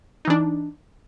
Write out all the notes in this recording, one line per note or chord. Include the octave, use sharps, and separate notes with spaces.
E3 D4 D#4